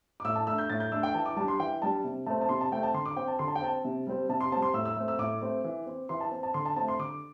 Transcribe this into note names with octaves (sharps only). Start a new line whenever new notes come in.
D6
A2 E6
A5
A3 D4 E6
G6
A2 A6
G6
A3 D4 E6
G5
E3 A5
D6
G3 D4 A5
C6
E3 G5
G3 D4 A5
C3
A3 C4 A5
A5
C3 C6
A5
A3 C4 G5
A5
D3 C6
D6
C4 G5
A5
D3 C6
A5
G5
C4 A5
C3
G3 C4
C3 A5
C6
G3 C4 A5
C6
A2 E6
E6
A3 C4
E6
A2 D6
A3 C4
E3
C4
E3 C6
A5
C4
A5
D3 C6
A5
A3 C4 A5
C6
D3 D6